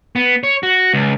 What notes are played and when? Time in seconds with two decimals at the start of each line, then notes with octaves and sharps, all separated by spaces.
0.16 B3
0.43 C#5
0.63 F#4
0.94 C#2